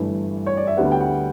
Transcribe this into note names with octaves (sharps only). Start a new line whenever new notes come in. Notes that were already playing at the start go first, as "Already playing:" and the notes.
Already playing: G1 G2 E3 A3
C#5
D5
E5
D2 D3 G3 B3 F#5
G5
F#5